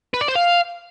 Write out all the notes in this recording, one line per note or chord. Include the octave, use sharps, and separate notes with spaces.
B4
D5
C5
F5